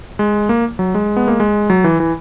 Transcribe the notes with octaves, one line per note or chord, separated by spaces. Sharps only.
G#3
A#3
F#3
G#3
B3
A#3
G#3
F#3
E3
E3